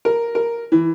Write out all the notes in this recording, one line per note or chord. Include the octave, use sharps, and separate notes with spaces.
A#4
A#4
E3